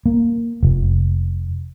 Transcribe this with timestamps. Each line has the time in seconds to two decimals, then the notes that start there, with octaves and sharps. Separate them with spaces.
0.06 A#3
0.63 F1